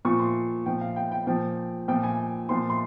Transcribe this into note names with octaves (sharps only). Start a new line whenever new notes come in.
A#2 F3 C#6
C6
A#2 F3 G5
F5
G5
G5
A#2 F3 G5
A#2 F3 G5
G#5
A#2 F3 C6
C6